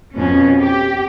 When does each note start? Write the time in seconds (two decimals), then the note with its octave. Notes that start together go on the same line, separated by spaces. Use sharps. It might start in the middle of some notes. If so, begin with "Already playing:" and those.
0.14 F2 B2 C#4
0.60 G4